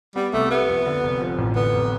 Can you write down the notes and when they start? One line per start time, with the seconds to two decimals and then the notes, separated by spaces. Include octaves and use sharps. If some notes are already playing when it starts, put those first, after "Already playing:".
0.16 G3 B3
0.33 C2 A3
0.51 G3 B3
0.68 F2
0.86 D3
1.03 F1
1.21 F3
1.38 A1
1.56 D3 B3
1.73 F1